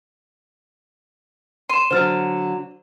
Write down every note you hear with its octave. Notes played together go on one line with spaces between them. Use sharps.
C6 D#7 E7
D3 F#3 C5 F6 A6